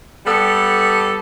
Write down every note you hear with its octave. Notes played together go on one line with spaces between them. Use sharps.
G3 B3 A4